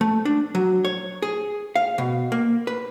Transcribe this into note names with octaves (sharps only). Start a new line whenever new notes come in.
A3
D4
F#3
C#5
G#4
F5
B2
A#3
B4